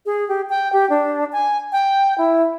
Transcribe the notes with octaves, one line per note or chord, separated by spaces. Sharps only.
G#4
G4
G5
G4
D4
G#5
G5
E4